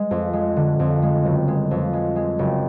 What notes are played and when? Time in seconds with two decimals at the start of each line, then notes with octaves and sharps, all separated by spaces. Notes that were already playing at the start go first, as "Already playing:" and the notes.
Already playing: G#3
0.11 F2
0.33 G#3
0.56 D3
0.79 F2
1.02 G#3
1.25 F#1
1.48 G#3
1.71 F2
1.93 G#3
2.16 G#3
2.39 F#1